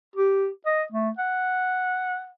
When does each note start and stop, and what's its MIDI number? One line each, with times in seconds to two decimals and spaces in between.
0.16 0.47 67
0.66 0.83 75
0.93 1.10 57
1.18 2.28 78